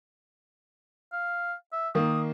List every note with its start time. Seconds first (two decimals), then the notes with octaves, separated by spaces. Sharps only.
1.12 F5
1.72 E5
1.95 D#3 A#3 D#6